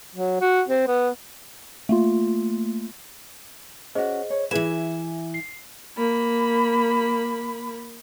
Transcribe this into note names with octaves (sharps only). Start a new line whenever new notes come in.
F#3
F#4
C4
B3
A3 A#3 F4
C#4 F#4 G#4 C5 D#5
C#5
E3 E4 G#4 B4 G#5 E7
C7
A#3 B5